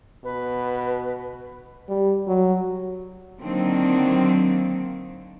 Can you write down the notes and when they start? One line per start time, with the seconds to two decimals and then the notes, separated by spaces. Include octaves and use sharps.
0.24 B2 B4
1.89 G3
2.27 F#3
3.41 D3 D#3 F#3 A#3 C4 D4